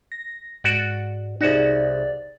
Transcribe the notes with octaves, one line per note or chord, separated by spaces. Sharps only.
A#6
G#2 F#4 D5
C2 D#4 F#4 G#4 D5